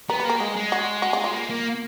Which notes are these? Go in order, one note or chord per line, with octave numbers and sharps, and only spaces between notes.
B3 A#4
B4
A#3 A#4
G#3 G#4
G#3
F#4
F#4
F4
F4
A#3
A#3